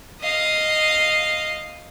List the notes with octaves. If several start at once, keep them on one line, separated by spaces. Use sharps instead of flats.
D#5 F5